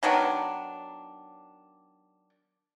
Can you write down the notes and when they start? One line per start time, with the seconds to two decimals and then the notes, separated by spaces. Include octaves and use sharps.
0.03 D#3 F#3 B3 D4